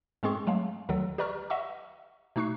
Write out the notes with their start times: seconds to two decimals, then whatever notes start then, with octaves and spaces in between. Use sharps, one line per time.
0.23 G#2 G#3 C4 G#4 C6 C#6
0.47 F#3 G#3 A3 F5
0.89 D2 D3 D#3 F#3 A4
1.18 G4 B4 D5 A#5 C#6 F6
1.50 D#5 E5 F#5 C#6 E6
2.36 B2 A3 D#4 C#6 F#6 C7